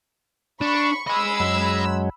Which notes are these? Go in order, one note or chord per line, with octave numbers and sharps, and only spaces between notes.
D4 B5 C#6
D#5 G#5 B5 E6
F#2 F#3 G#3